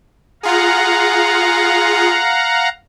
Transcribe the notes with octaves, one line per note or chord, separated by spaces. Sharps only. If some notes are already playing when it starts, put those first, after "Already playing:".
F4 G#4 F5 F#5 A#5